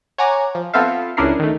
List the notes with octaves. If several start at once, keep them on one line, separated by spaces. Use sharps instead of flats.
C#5 F#5 G#5 A#5 D6
F3
B3 C4 F4 A4 E5 F5
C#2 C#4 D4 E4 A#4 C7
D#3 A3